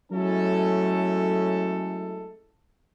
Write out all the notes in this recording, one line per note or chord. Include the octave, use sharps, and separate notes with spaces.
F#3 G#3 A3 C#4 E4 A4